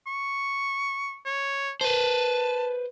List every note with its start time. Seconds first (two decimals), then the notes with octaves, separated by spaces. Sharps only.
0.07 C#6
1.26 C#5
1.81 B4 C5 A5